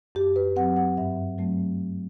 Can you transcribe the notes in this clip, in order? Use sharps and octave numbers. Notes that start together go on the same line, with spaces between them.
F#2 G4
B4
F#3 C4 F#5
F#5
G2 E5
F#3 A3 C4